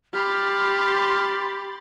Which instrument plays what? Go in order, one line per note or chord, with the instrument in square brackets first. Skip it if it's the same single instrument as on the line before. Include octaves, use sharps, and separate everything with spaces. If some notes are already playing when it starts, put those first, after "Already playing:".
[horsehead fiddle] G4 [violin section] B5 C6 A6 [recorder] F6